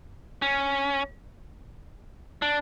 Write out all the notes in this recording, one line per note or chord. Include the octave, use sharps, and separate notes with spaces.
C#4
D4